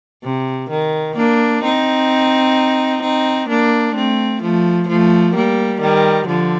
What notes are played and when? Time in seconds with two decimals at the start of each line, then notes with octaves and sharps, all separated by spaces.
0.23 C3
0.70 D#3
1.16 A#3 D4
1.64 C4 D#4
3.02 C4 D#4
3.49 A#3 D4
3.95 A3 C4
4.41 F3 A3
4.88 F3 A3
5.34 G3 A#3
5.81 D#3 G3
6.27 D3 F3